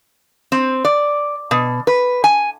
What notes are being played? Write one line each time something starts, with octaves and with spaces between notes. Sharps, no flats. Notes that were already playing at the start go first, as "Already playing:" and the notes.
C4
D5
B2
B4
G#5